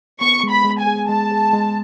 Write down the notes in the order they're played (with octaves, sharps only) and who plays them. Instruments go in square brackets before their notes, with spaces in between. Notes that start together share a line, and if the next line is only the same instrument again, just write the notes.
[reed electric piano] B3 [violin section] C#6
[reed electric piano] G#3
[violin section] B5
[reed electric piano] G#3
[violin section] G#5
[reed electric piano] G#4
[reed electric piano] G#3 [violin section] A5
[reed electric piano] G#4
G#3